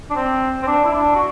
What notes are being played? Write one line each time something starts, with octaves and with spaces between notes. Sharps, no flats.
D4
C4
C4
D4
E4
D4
F#4